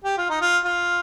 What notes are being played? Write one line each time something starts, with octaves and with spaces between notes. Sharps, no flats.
G4
F4
D#4
F4
F4